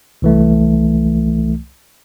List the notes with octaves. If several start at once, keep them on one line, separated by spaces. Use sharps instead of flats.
C2 E3 A3